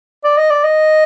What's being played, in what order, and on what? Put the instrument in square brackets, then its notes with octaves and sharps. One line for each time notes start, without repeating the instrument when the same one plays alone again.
[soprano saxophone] D5
D#5
D5
D#5